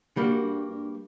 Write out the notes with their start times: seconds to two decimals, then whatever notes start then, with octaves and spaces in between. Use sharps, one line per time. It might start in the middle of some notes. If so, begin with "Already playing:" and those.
0.17 G2 G3 A#3 F#4
0.43 G2
0.69 G2